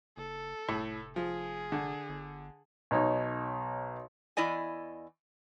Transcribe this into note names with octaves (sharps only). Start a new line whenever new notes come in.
F#1 A4
F1 A2
F3 G#4
D3
G1
B1 D#4 C#5
E2 E4 D5 D#5 G#5